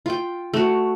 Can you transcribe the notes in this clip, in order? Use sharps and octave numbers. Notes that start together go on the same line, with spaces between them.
F4 G5
A3 F#4